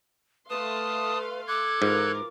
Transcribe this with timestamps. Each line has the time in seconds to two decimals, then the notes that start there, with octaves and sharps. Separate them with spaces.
0.50 A3 B4 F5 A5 C6 D#6
1.47 A4 D6 F#6 G#6
1.82 G#2 E3 F4 A#4